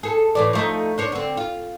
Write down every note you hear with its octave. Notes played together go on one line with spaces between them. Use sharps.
G#4 A4
A2 E3 D5
F3 A3 D#4
D4 C5 C#5
D3 C4
F4